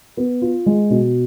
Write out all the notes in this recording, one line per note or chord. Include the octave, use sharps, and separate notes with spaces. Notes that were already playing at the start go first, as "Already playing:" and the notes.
B3
F4
G#3
B2